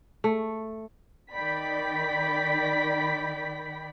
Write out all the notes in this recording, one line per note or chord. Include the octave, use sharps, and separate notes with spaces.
A3
D#3 D5 G5 B5 B6